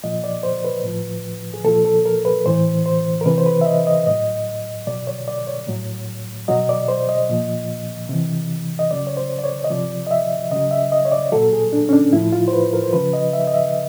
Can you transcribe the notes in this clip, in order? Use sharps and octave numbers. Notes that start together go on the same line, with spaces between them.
A#2 F3 D#5
D5
C5
B4
A2 F3
G#4
A#2 F3 A4
A4
A#4
B4
A2 E3 C5
C5
A#4
C3 E3 B4
C5
B4
E5
D#5
D#5
A2 F#3 D#5
B2 F#3 D5
C#5
D5
C#5
A2 F#3
B2 F#3 D#5
D5
C5
D#5
A#2 F3
C3 E3
D#5
C#3 F#3 D5
C#5
C5
D5
C#5
D#5
C3 F3 D5
D#5
E5
C#3 F#3 D#5
E5
D#5
C#5
D5
A#2 F#3 A4
G#4
D4
C#4
D4
A2 F3 E4
F4
C5
B4
A#4
C5
C#3 F3 B4
D#5
E5
D#5
E5